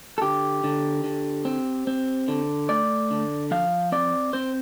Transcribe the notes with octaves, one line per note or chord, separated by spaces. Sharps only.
A4
D3 G4
D3
D3
C4
C4
D3
A3 D5
D3
F3 F5
C4 D5
C4 C5